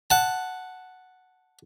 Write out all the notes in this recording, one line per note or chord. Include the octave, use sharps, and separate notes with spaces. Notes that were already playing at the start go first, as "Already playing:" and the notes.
F#5 A5